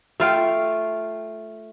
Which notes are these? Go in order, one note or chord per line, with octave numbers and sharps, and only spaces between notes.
A3 F4 G5